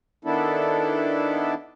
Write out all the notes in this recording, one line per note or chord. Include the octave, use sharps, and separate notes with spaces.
D#3 B3 D4 E4 A4